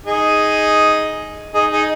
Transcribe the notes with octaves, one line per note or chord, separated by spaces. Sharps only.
D#4 G#4
D#4 G#4
D#4 G#4